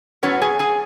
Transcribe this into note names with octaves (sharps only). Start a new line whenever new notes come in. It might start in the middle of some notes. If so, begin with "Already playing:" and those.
A2 F#3 B3 C#4 C#5
G#4 G#5
G#4 G#5